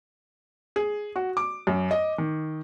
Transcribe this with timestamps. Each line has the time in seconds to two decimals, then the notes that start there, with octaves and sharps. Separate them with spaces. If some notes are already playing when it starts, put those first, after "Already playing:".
0.76 G#4
1.16 F#4
1.37 D6
1.67 F#2
1.91 D#5
2.18 D#3